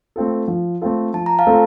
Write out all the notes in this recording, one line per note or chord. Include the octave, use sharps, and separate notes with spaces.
A3 C4 F4 A4
F3
A3 C4 F4 A4
F3 A5
A#5
F5 A5
A3 C4 F4 A4